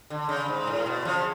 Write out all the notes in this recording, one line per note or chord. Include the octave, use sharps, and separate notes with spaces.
D3
C#3
G#2
A2
B2
C#3 F3